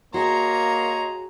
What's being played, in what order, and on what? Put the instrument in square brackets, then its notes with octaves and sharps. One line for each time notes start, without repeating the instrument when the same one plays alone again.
[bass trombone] A#3 [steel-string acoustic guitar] F#4 G#4 [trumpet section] C#5 D#5 C6 [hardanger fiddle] A#5